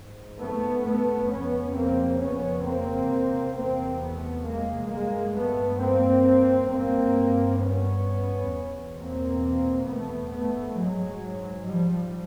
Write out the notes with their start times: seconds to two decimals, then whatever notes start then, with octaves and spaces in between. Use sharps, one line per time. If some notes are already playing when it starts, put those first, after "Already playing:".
Already playing: G#2
0.40 A3 B3
0.86 A3 B3
1.31 F2 C#3 B3 C#4
1.76 A#3 C4
2.21 B3 C#4
2.66 A#3 C4
3.11 E2 C3
3.56 A#3 C4
4.01 A3 B3
4.46 G#3 A#3
4.91 G2 G#3 A#3
5.37 A3 B3
5.82 A#3 C4
6.72 G2 A#3 C4
7.62 B3 C#4
8.53 E2 B2
8.98 A#3 C4
9.88 A3 B3
10.33 G#2 A3 B3
10.78 F#3 G#3
11.68 F3 G3